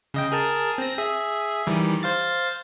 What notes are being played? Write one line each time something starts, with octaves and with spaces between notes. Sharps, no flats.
C#3 D#5 G5
G#4 A#4 A5
C4 A#6
G#4 E5
D#3 E3 G3
C5 F5 A6